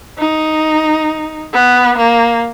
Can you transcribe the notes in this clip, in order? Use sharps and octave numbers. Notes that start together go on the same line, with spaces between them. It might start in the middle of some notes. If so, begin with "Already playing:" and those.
D#4
B3
A#3